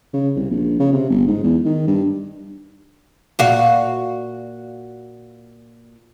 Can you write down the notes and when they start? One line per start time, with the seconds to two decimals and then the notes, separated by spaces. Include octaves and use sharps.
0.13 C#3
0.36 C2
0.51 A#1
0.80 C#3
0.92 C3
1.10 G1
1.27 G#2
1.43 E2
1.65 D#3
1.87 G2
3.39 A#2 F#4 F5